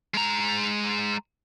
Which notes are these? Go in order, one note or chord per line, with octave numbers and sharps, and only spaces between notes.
G#3 A#5